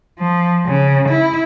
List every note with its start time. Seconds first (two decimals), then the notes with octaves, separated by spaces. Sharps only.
0.19 F3
0.66 C#3
1.09 E4